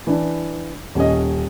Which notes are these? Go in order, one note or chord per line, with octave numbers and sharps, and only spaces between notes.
E3 D4
D#1 C#4 D#5